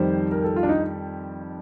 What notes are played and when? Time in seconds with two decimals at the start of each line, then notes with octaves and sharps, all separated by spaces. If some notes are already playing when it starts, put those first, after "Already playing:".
Already playing: F2 D#3 G3 C5
0.31 A#4
0.44 A4
0.56 F4
0.63 D4
0.69 D#4